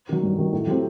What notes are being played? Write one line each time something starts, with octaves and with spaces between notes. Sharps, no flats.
D#3 F#3
G2
D#3 F#3
A2
F#3 A3 C4 G4